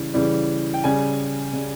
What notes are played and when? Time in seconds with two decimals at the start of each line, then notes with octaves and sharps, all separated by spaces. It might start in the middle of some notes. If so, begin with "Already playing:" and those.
Already playing: C#3 E3 G3
0.14 C#3 E3 G3
0.74 G5
0.84 C#3 G3 G#5
1.53 C#3 G3